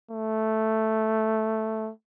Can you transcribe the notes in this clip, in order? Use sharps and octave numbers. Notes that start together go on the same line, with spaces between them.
A3